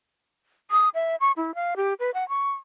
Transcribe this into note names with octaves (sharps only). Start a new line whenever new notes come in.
D#6
E5
C#6
E4
F5
G4
B4
F#5
C#6